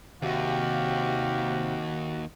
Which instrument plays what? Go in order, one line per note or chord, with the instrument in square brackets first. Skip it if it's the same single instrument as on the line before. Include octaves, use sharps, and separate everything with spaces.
[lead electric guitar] D#2 [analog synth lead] C3 [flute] F#4 [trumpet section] G4 F5